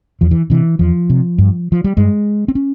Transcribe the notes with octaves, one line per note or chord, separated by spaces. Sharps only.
E2 F3
E3
C3 E3
E2 F3
C3
G2
F3
G3
G2 G#3
C4
C#4